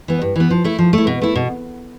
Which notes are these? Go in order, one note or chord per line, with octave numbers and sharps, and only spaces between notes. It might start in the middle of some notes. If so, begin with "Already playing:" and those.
E3 B3
G2
E3 B3
F3
A3 E4
F3
A3 E4
B2
A3 E4
B2